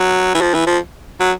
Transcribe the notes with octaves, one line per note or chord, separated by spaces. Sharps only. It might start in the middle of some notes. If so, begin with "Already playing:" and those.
Already playing: F#3
E3
F3
E3
F3
F#3